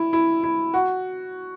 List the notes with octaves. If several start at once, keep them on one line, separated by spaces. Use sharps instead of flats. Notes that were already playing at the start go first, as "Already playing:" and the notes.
Already playing: E4
E4
E4
F#4